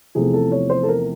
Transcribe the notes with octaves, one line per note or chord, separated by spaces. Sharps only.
E2 C3 F3 A3 G#4
A4
C#5
C5
A4
A#4